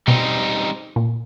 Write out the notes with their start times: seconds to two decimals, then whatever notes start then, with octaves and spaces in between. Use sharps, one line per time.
0.07 B2 G3 C4 D#4
0.96 A#2